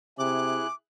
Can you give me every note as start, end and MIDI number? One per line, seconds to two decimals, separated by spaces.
0.19 0.65 48
0.19 0.67 64
0.19 0.67 68
0.19 0.74 86
0.19 0.67 90